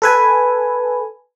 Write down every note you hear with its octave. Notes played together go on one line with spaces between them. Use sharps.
A4 B4 G#5